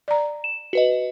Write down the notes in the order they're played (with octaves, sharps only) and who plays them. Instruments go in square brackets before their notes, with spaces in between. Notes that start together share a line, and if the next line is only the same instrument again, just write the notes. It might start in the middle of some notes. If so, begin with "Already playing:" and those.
[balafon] D5 A#5
[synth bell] E7
F#4 B4 D#5